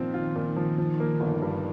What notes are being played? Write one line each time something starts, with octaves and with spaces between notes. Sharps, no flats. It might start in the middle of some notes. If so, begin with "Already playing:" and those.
Already playing: A#2 D#3 F3 C4
F4
A#2
F3
D#3 F3
A#3
G1 D#3
G2